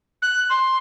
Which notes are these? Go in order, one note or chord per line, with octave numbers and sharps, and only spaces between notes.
F#6
C6